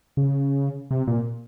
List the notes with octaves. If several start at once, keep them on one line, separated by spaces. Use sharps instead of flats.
C#3
C3
A#2